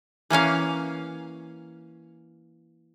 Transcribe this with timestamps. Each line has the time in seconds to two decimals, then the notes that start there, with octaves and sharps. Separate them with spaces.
0.30 E3 A#3 C#4 F5